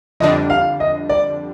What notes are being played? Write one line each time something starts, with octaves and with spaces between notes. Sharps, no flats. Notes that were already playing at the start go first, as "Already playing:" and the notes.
F2 D3 G3 D4 D#5
F5
D#5
D5